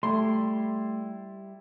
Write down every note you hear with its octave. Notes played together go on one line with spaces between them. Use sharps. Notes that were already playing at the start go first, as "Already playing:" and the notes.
G3 A3 E4 C6